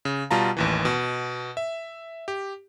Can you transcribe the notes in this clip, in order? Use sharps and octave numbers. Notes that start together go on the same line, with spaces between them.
C#3
B2 G3 F4 A5 A#5
A1 D#2 E3
B2
E5
G4